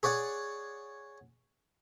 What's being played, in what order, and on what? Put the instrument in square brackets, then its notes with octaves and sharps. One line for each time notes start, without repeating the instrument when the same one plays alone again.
[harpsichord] G#4 C#5 D5 F#5